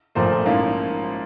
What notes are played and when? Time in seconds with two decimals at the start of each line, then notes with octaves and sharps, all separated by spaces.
0.15 A#1 A#2 F3 A3 A#4 C5
0.46 G#2 F3 A#3 C#4 E4